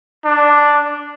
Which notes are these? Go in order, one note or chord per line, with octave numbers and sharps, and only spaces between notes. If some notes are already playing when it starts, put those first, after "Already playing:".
D4